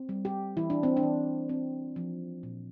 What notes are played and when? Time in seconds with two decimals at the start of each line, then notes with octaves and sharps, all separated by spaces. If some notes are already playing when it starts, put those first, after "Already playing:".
Already playing: C4
0.09 G3
0.25 G4
0.57 E3 E4
0.70 D4
0.83 C4
0.97 D4
1.03 E3
1.49 C4
1.96 F3
2.43 A#2